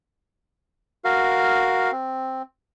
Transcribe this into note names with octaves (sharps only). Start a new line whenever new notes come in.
F#4 A#4 F5
C4